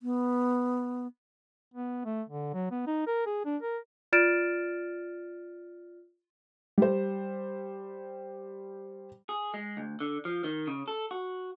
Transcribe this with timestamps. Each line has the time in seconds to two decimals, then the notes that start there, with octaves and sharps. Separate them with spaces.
0.03 B3
1.74 B3
2.05 A3
2.29 D3
2.54 F#3
2.71 B3
2.87 D#4
3.07 A#4
3.26 G#4
3.45 D4
3.62 A#4
4.13 F4 D5 F6 A6 D7 E7
6.78 G3 C5
9.29 G#4
9.54 G#3
9.77 D2
10.00 D3
10.25 F3
10.44 D#3
10.67 C#3
10.88 A4
11.11 F#4